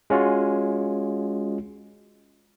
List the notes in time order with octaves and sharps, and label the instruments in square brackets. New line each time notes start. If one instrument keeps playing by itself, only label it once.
[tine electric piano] G#3 C#4 F4 F#4